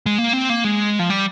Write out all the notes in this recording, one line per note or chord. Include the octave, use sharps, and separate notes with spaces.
G#3
A#3
C4
A#3
G#3
F3
G3